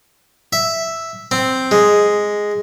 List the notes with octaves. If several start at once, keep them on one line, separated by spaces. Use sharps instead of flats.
E5
C4
G#3